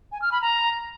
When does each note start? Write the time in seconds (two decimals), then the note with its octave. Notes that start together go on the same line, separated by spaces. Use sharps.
0.12 G#5
0.22 F6
0.32 B5
0.42 A#5